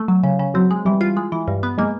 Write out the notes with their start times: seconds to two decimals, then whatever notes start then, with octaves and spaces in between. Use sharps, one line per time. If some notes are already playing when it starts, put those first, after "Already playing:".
Already playing: A3
0.08 F#3
0.23 C#3
0.39 C#3
0.54 F#3 C4
0.71 G#3
0.85 E3 G3
1.01 F4
1.17 G#3
1.32 E3
1.48 G2
1.63 B3
1.78 G#3 A#3